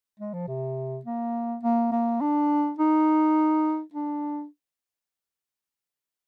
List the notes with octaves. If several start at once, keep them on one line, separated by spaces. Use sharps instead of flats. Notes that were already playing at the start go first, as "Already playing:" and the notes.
G#3
F3
C3
A#3
A#3
A#3
D4
D#4
D4